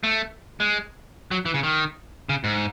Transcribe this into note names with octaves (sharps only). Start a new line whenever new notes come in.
A3
G#3
F#3
E3
C#3
D#3
C#3
G#2